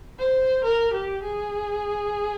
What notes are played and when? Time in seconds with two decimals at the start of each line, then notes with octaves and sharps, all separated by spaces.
0.19 C5
0.64 A#4
0.93 G4
1.23 G#4